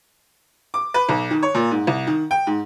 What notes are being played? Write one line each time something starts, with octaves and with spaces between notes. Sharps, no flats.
D6
B4
B1
D#3
C#5
A#2
G#2
C2
D#3
G5
G#2